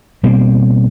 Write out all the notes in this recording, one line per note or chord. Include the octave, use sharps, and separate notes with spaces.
B2 G3 A#3 C4